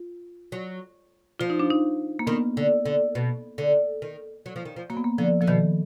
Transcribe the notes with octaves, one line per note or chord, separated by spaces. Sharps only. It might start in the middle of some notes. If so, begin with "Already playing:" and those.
Already playing: F4
F#3
F3 F4
D#4
D4
D#4
A#3
D#3 B3
D3
D3
B2
D3
D#3
F#3
F3
D#3
F3
F#3 A#3
B3
A#3
D3 F3
D3 F3
B2 D#3